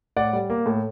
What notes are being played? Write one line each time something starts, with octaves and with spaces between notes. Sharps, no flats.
A2 D5 F#5
G3
A#3
A2